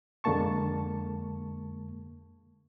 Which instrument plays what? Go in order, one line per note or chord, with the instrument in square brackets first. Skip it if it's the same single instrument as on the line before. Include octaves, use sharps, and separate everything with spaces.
[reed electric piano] F2 D3 G#3 A#3 A5 C#6